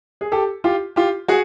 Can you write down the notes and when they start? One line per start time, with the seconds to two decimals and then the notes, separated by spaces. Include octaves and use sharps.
0.21 G#4
0.32 G4 A4
0.64 F4 G4
0.96 F4 G4
1.28 F#4 G#4